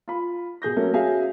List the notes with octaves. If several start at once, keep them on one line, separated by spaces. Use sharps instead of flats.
F4 B5
B2 G#4 G6 A#6
F#3 A3 A#3 C#4 F#4
C#4 F#4 G#4 E5 F5 G#5